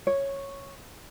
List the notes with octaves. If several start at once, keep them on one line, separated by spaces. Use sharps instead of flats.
C#5